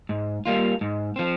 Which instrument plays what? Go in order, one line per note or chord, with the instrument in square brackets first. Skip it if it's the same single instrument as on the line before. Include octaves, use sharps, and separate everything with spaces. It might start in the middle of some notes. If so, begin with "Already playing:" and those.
[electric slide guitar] G#2
G3 A#3 F4
G#2
F3 C4